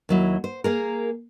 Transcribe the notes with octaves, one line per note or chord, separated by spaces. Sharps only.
D#2 F#3 E4
C5
A#3 G#4 A#4